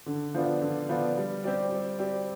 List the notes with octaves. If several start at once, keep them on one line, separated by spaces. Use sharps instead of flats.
D3
F3 B3 D4 F4
D3
F3 B3 D4 F4
G3
C4 G4 D5
G3
C4 G4 D5